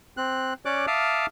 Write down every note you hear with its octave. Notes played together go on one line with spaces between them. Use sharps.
C4 F#6
C#4 C#5 D5 D6 F#6
E5 F5 A5 D6 D#6 F6